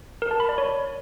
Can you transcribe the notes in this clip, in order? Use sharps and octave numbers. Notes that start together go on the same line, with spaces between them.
A#4
A5
B5
D5
C#5